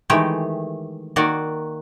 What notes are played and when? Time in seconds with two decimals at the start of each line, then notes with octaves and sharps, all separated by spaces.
0.10 D#3 E3 G#3 A3 G4
1.16 D#3 A#3 F#4 D5